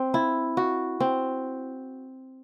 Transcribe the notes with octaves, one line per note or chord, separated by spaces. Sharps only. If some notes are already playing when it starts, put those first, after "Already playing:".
Already playing: C4
E4
F#4
C4